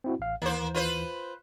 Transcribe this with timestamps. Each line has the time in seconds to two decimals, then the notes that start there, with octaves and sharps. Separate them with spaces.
0.04 C4 E4 F#4
0.19 A1 F5
0.42 D#2 E3 A#3 C5
0.75 F4 B4 C5